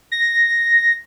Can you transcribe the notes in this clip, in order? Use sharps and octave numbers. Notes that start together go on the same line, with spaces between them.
A#6